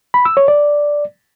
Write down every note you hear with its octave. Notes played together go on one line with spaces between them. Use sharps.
B5
E6
C#5
D5